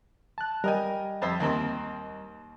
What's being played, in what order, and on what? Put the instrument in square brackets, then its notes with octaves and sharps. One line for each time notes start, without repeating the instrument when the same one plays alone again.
[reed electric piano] A5 F#6
[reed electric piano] G3 D#5 G5 [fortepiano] A#4 G#5
[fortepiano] F2 C5 E5
D#2 A#3 C4